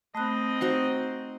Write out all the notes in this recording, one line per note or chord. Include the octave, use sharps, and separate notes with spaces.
A3 C4 D#5 B5 F#6
D#4 F#4 C5 C#6